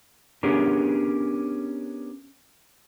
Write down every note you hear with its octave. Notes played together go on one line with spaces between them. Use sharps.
B3 C#4 D4 G4 G#4 A#4